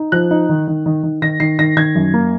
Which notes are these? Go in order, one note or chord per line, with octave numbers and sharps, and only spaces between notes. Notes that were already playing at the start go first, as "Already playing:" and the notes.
Already playing: D#4
F3 F#6
D#4
D#3
D#3
D#3
D#3
D#3 A#6
D#3 C7
D#3 A#6
D#3 G#6
F#2
A#3